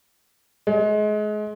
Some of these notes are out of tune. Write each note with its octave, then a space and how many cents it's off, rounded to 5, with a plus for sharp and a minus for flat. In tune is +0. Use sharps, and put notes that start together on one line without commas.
G#3 +30